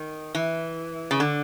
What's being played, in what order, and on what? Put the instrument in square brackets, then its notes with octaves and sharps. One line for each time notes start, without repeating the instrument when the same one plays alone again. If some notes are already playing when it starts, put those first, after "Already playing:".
Already playing: [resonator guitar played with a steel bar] D#3
E3
C#3
D3